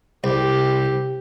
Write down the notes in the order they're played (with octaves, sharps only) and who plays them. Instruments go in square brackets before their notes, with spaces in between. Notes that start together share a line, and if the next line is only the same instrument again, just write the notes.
[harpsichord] C2 [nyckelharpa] G4